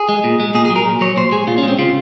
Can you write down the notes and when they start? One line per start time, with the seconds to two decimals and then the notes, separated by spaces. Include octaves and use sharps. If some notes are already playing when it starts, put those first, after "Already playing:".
Already playing: G#4
0.09 G#3
0.24 A#2
0.40 G#3
0.55 A#2 G#4
0.65 G#4
0.70 F#3
0.76 A#4
0.86 A#2
1.01 F#3 C#5
1.16 A#2 C5
1.32 G#3 G#4
1.47 A#2 F4
1.58 C#4
1.63 G#3 C4
1.79 C#3 F4